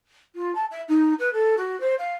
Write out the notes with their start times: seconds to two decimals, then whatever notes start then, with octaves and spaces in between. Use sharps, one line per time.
0.36 F4
0.55 A5
0.71 E5
0.89 D#4
1.19 B4
1.33 A4
1.57 F#4
1.81 C5
1.99 F5